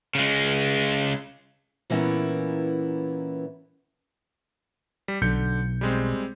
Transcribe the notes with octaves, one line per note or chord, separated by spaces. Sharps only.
C#3 G#3
A#2 E3 A#3 B3 C#4 E4
G3
B1 D3 G6 C#7
G3 G#3 C4